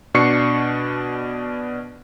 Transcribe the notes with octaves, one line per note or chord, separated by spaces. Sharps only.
B2 D4 C#6 C7 C#7